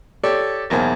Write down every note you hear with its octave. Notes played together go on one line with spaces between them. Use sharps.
G4 A4 C#5 D5
B1 E2 A#3 C5 G#5